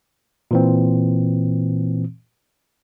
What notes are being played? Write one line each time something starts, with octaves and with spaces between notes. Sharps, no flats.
A#2 E3 C4